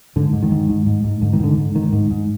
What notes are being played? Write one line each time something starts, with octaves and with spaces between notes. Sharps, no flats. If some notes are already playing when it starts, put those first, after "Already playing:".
G#2 D3
G#2
D#3
G#2
G#2
G#2
G#2
G#2 D3
D#3
G#2 D3
G#2
G#2 D#3
G#2
G#2